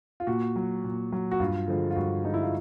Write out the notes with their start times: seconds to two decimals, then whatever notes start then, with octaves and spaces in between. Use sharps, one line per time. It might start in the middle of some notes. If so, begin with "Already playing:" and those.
0.20 F4
0.27 A#2 F#4
0.56 F#3
0.84 A#2
1.12 F#3
1.31 F#4
1.40 G2 F4
1.68 D3 F3 G#3
1.91 F4
1.96 G2 F#4
2.24 D3 F3 G#3 D#4
2.34 E4
2.43 F4